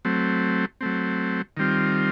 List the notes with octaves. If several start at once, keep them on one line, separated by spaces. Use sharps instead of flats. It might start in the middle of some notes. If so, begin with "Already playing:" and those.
F#3 A3 C4
F#3 A3 C4
D#3 G3 C4 F4